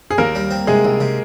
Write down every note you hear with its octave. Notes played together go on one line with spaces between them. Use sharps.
G#4
D#2 A#3 A#4
G3
C4
C3 G#3 G#4
C2
C3